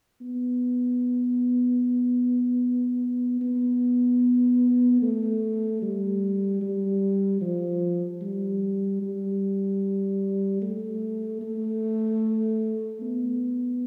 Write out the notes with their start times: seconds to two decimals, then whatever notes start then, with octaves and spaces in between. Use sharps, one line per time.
0.22 B3
3.41 B3
5.02 A3
5.82 G3
6.62 G3
7.41 F3
8.22 G3
9.02 G3
10.62 A3
11.41 A3
13.02 B3